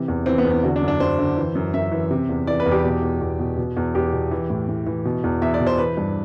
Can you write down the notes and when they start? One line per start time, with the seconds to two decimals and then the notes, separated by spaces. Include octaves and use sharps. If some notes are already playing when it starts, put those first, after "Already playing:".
Already playing: C3 E3
0.08 E2
0.26 E3 C4
0.38 B3
0.45 E2
0.51 B3
0.63 D3 F#4
0.76 D4
0.82 F#2
0.88 D4
1.00 F#2 C5
1.19 D3
1.37 E3
1.55 F#2
1.74 F#2 E5
1.92 E3
2.11 C3
2.29 E2
2.47 E3 D5
2.60 B4
2.66 E2
2.72 G4
2.84 B2
3.02 E2
3.21 E2
3.39 B2
3.58 B2
3.77 E2
3.95 E2 G4
4.13 B2
4.31 E3
4.50 A2
4.68 A2
4.87 E3
5.05 B2
5.24 E2
5.42 E2 E5
5.54 D5
5.60 B2
5.67 C5
5.78 E3 B4
5.97 G2